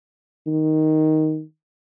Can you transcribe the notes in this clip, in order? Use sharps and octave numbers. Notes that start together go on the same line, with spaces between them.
D#3